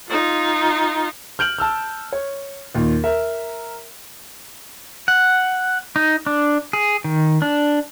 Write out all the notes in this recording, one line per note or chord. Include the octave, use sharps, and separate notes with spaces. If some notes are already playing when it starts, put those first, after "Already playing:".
D#4 F4
F6 G6 D7 F#7
A5 E6 F6
C#5
D#2 A#2
A#4 E5
F#5
D#4
D4
G#4
D#3
D4